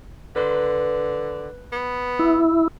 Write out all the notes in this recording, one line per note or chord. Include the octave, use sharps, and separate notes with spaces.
D3 B4 C6
B3
E4